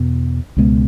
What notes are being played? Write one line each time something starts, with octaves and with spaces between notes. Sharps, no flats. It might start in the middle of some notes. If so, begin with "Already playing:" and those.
Already playing: E2 B2 B3
C#2 B2 G#3 B3